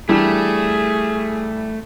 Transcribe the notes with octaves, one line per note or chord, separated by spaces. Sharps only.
E3 G3 A3 D4 G#4